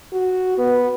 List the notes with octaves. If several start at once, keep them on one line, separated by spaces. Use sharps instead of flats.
F#4
B3